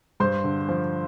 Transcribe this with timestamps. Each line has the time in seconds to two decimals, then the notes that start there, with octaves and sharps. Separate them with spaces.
0.20 G2 C5 C6
0.44 D3
0.69 F3